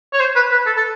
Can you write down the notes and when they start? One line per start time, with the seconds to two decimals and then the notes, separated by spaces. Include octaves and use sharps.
0.13 C#5
0.20 C5
0.36 B4
0.52 B4
0.66 A4
0.77 A4